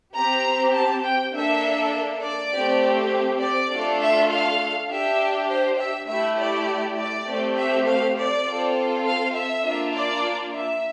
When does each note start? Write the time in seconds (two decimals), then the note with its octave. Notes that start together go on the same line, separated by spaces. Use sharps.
0.14 C4 G4 A#5
0.74 A5
1.04 G5
1.34 A#3 D4 A4 E5
2.23 D5
2.52 A3 C4 G4
3.41 D5
3.71 A3 D4 F4 A4
4.00 E5
4.30 F5
4.89 D4 G4 E5
5.48 C5
5.79 E5
6.08 A3 E4 G4 E5
6.38 D5
6.97 D5
7.27 A3 C4 G4
7.57 E5
7.86 F5
8.16 D5
8.46 C4 F4 A4
9.06 F5
9.34 E5
9.64 A#3 D4 F4
9.93 D5
10.54 E5